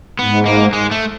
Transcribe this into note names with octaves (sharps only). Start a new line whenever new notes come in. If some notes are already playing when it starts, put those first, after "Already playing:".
G#2 B3
A#3
G#3
A3